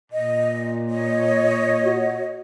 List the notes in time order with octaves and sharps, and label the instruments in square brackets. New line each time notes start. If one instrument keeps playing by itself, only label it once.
[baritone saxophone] A#2 [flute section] D#5
[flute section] C#5 D#5
[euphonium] F#4